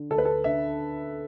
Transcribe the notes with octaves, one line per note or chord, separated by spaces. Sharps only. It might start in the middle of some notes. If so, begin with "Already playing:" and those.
Already playing: D3
D2 A4
B4
A4
D3 E5